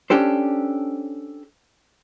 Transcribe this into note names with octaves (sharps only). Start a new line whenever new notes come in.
C#4 D4 G4 A4 C5